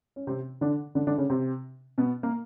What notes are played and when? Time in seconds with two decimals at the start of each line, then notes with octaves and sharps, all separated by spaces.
0.16 C#4
0.27 C3 C4
0.61 D3 D4
0.95 D3 D4
1.07 D3 D4
1.18 C#3 C#4
1.30 C3 C4
1.98 B2 B3
2.23 A#3